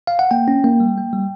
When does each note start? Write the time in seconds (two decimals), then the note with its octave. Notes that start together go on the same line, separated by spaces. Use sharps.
0.07 F5
0.19 F#5
0.31 A#3 G5
0.48 C#4
0.64 A#3
0.80 G3
0.97 A#3
1.13 G3